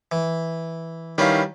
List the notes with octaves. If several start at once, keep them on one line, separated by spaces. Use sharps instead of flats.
E3
D#3 G3 C#4 E4 B4 F5